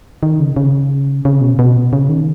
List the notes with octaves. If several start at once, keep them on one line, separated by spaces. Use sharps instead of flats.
D#3
C#3
C#3
C#3
B2
B2
C#3
D#3